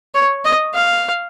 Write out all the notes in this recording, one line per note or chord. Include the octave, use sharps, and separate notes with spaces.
C#5
D#5
F5